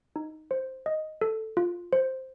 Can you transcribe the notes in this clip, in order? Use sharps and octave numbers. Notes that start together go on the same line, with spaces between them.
D#4
C5
D#5
A4
F4
C5